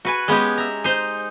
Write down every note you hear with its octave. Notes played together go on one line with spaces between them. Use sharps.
F#4 B4 G#5
G#3 B3 C#4 G4
E5 A#5
D#4 C5